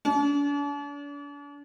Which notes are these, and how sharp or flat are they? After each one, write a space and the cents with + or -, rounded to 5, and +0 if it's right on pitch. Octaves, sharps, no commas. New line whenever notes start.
D4 -40